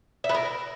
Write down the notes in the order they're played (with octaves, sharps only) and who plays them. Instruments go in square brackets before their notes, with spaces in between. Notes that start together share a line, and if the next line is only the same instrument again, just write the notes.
[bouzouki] E5
B3
A#4